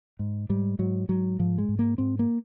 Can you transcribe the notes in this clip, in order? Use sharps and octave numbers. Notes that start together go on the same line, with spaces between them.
G#2
G#2 G3
G#2 F#3
G#2 F#3
G#2 F3
G#3
G#2
A#3
G#2 C4
A#3